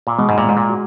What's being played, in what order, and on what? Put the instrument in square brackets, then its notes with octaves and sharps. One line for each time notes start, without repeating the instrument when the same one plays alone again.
[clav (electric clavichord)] A#2
[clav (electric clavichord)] B2 [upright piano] G#3
[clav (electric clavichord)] G#2
A#2
[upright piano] G#3
[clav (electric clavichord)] G#2
A#2
[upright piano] F#4